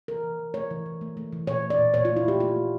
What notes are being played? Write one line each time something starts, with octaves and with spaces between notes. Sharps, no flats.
E3 A#4
E3
E3
A3 C#5
E3
E3
A3
A3
E3
A#2 C#5
A3
D5
A#2
A#2 C#5
A3 F4
E4
A3 G4
A3 F4
A3